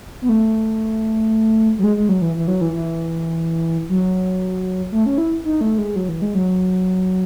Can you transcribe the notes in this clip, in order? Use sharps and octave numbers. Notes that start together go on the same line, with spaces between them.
B3
A3
F#3
G#3
G#3
F#3
E3
E3
F#3
E3
E3
F#3
A3
C#4
E4
D#4
A3
G#3
F#3
E3
G#3
F#3